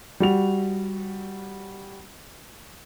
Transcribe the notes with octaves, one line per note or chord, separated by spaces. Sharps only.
G3 F#4 F7